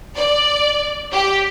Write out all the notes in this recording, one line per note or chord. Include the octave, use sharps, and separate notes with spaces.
D5
G4